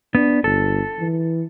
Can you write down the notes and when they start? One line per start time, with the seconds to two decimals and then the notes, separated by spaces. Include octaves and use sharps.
0.15 B3 D4
0.44 G1 A4
0.99 E3